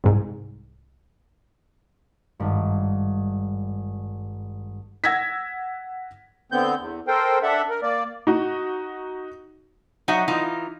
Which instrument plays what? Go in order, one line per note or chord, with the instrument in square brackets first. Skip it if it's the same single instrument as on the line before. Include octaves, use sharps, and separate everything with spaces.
[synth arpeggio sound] C2 G#2
[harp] G#1 G2
[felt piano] F#5 E6 G#6 A#6 B6
[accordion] D3 B3 C4 G6
E2
A4 A#4 C5 G5
D4 A4 E5 F#5
A#4
A#3 D5
[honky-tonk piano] D#4 F#4
[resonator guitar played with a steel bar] F#3 D#4 E5 F#5
E3 D#4 F4